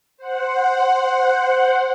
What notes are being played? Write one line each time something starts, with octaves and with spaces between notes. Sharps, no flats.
C5 F#5